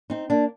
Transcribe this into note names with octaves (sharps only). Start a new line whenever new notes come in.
C4 D#4
A#3 D4